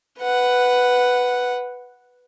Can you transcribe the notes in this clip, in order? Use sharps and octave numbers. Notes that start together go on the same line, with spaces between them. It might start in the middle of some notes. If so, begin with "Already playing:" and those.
B4 F#5